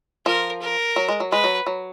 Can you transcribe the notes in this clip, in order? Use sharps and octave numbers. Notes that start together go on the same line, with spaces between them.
F3 A#4
A#4
F#3
G#3
F#3
G#3 B4
F#3
F#3